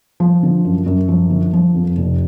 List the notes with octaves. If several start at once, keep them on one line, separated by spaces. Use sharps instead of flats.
F3
D3
F#2
F#2
F3
D3
F3
F2
F1